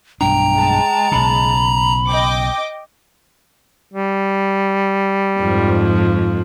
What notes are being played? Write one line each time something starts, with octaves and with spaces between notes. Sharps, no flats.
B1 G2 D4 G5 A#5
G#3 A5
B1 C#3 B5
D#5 G5 D6
G3
F2 G#2 F3